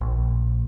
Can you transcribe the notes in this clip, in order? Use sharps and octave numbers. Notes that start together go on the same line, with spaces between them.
A#1